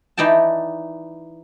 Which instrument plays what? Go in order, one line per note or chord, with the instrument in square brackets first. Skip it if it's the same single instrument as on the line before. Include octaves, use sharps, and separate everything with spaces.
[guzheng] E3 D#4 D5 G5 A5